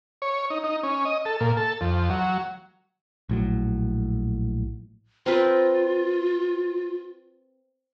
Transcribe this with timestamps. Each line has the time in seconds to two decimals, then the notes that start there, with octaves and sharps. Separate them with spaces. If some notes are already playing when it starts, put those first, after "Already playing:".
0.22 C#5
0.50 D#4
0.64 D#4
0.83 C#4
1.05 D#5
1.25 A4
1.40 A#2
1.57 A4
1.81 F2
2.10 F#3
3.29 A#1 A2 F#3
5.26 C4 F4 A#4 B4